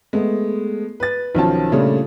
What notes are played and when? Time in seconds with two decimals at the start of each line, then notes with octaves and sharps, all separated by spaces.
0.13 G#3 A3 B3
1.00 B4 A6
1.35 B1 D#3 F3 C#4 F4 A5
1.72 A#2 C#3 G3 A3 C#4 D4